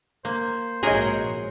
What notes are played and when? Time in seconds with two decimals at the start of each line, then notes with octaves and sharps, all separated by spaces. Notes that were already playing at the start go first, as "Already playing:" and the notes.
0.25 A#3 C5
0.83 A#1 G#2 C3 F#4 G#4 A#4 C#5 D#5